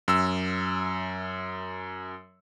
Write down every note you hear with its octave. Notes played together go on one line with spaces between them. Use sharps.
F#2 E6